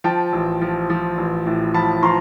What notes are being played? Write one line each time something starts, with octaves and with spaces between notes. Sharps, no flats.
F3 G5 A5
A1
F3
F3
A1
A2
F3 A5 B5
F3 A#5 C6